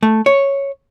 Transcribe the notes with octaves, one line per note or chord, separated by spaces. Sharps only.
A3
C#5